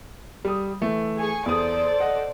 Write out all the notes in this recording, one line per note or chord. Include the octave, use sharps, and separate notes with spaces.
G3 D#6
E3 A3
G#4 G#5 C#6
E2 A4 C5 D5 D#6
D#5 F#5